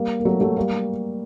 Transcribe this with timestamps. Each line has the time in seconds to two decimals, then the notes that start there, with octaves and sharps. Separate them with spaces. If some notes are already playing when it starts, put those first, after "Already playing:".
Already playing: G3 A#3
0.20 A#3
0.25 F#3 A3
0.41 F#3 A3
0.56 G3 A#3